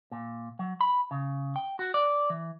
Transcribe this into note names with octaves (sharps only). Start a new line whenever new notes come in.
A#2
F#3
B5
C#3
G5
F#4
D5
E3